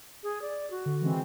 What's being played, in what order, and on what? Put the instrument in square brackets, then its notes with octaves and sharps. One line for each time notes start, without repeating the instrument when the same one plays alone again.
[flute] G#4
D5
F#4
[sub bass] D3
[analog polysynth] E3 G#3 C4